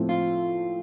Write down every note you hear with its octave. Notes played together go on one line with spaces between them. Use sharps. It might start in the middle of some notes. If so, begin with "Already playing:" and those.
Already playing: A2 F3 A3 C4
F4